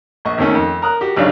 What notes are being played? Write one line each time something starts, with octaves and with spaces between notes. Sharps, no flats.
A#1 D#5 C#6
G#1 D#2 D#3 A3 C#4
F2
A#4 A#5 D#6 F#6
F#4 G4
G#1 C#3 F#3 D4 C#5 F5